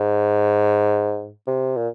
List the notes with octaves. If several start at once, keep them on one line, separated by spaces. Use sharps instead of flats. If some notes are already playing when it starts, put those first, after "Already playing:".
Already playing: G#2
C3
A#2